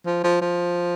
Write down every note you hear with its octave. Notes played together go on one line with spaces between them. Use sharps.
F3
F3
F3